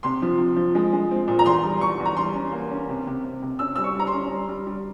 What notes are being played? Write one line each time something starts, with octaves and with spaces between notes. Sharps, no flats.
C3 C6
F3
C3
F3
G#3
G#3
C4
A#2
A#5
E2 C6
G3
E2 C#6
E2
A#5
G3 C6
C#4
A#3
C#4
C3
C3
C3
C3
C#4 E6
G3 E6
C#6
G3 A#5
C6
C#4
G3
G3
G3